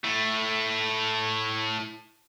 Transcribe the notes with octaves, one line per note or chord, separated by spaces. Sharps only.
A2 A3